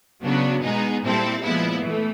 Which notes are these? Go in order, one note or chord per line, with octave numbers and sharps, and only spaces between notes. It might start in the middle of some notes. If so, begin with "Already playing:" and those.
C#3 F#3 B3 D4 F#4
B2 G#3 B3 D#4 G#4
A#2 G3 C4 E4 A4
A#2 F3 G#3 B3 E4
E3 A3